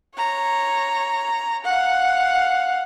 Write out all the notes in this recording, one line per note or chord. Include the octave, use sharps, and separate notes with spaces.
C#5 A#5
F5 F#5